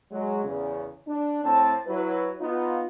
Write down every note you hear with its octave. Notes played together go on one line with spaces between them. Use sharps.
F#3 G#3
E2 C#3
D4
A2 C4 A5
F#3 E4 B4
B3 D#4 F4